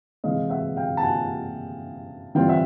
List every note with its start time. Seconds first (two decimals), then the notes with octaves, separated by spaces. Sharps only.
0.24 C3 E3 G#3 D#5 F5
0.50 E5 F#5
0.76 F5 G5
0.97 A5
1.02 F#5 G#5
2.35 E3 G3 C4 F4 F5 G5
2.48 E5 F#5